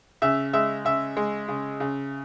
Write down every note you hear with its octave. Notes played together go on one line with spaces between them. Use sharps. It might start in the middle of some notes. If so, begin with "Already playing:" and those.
C#3 E5
G#3 E5
C#3 E5
G#3
C#3
C#3